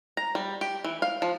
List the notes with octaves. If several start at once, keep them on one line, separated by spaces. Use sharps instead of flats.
A#5
G3
G4
E3
F5
F3